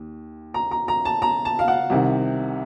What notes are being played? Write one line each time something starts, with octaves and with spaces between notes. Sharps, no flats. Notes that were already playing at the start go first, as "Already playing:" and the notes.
Already playing: D#2
A#5
A#5
A#5
A5
A#5
A5
F5
F#5
C2 C3 D#3